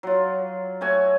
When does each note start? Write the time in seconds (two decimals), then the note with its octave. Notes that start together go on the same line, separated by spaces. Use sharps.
0.03 F#3 F4
0.81 A3 F#4 C#5 G#5